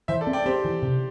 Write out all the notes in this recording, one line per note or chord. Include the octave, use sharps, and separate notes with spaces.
E3 C5 E5
A4 D5
C4
D5 G5
C4 G4 C5
E3
C3